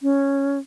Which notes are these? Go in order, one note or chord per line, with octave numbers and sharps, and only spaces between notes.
C#4